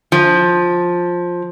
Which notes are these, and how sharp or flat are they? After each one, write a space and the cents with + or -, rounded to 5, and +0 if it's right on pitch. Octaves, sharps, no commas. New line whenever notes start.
F3 +10